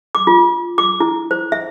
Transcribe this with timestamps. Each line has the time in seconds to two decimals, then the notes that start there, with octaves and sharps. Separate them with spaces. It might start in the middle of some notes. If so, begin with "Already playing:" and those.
0.15 D6
0.27 F4
0.78 D6
1.00 E4
1.31 C5
1.52 E5